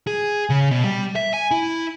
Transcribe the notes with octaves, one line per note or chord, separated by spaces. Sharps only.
G#4
C#3
B2
G3
E5
G#5
E4